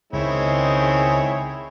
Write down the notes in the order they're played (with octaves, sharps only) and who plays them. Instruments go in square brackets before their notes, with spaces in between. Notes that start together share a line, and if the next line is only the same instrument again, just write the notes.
[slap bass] C#2 [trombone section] D#3 G#3 G#4 [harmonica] C4 E4 C#5